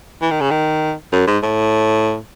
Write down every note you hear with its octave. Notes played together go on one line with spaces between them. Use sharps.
E3
D#3
C#3
D#3
F#2
G#2
A2